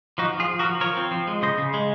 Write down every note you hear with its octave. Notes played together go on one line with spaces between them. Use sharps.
F3 D#4 F#4
F3
F4 G#4
F3
F#4 A#4
F3
F3 A#4 C#5
C4
F3
G#3
C#3 C5 D#5
C#3
G#3